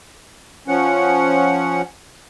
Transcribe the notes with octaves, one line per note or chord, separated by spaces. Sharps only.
F3 C#4 F#5